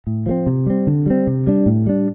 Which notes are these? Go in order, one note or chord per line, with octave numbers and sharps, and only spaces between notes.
A2
F3 A3 C4
C3
G3 C4
D3
G3 C4
C3
G3 D4
A2
G3 D4